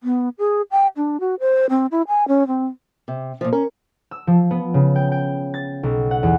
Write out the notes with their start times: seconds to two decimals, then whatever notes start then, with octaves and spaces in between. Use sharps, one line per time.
0.03 B3
0.39 G#4
0.71 G5
0.97 D4
1.20 F#4
1.40 C5
1.70 C4
1.91 E4
2.08 G#5
2.28 C#4
2.47 C4
3.08 C3
3.41 A#2 F3
3.53 C#4 A#4
4.11 E6
4.27 F3
4.51 B3
4.74 C#3
4.96 G5
5.12 G5
5.54 A6
5.83 B1
6.11 F#5
6.23 E2